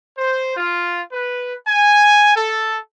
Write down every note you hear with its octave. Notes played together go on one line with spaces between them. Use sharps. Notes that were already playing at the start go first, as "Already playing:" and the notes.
C5
F4
B4
G#5
A4